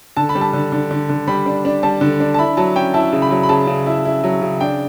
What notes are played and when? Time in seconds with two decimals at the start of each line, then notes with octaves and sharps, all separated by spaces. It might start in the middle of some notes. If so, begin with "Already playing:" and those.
0.17 D3 A5
0.29 B5
0.35 G3
0.41 A5
0.53 D3
0.72 D3
0.91 D3
1.09 D3
1.27 G3 B5
1.46 D4
1.65 D4
1.83 G3 A5
2.01 D3
2.20 D4
2.34 A5
2.38 E4 B5
2.57 F#3 A5
2.75 C#4 G5
2.94 E4 A5
3.13 C#3
3.22 B5
3.31 F#3
3.43 B5
3.49 C#3 A5
3.67 C#3
3.86 E4
4.05 E4
4.24 F#3
4.42 C#3
4.60 D4 G5